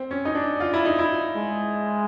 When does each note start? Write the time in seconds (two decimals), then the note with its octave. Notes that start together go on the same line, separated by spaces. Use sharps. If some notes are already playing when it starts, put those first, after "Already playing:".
Already playing: C4
0.11 C#4
0.25 D#4
0.35 D4
0.60 F4
0.73 E4
0.85 D#4
0.99 E4
1.37 G#3